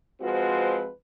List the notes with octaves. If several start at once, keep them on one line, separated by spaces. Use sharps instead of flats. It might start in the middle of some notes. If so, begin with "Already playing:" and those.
F3 G#3 C4 F4 F#4 B4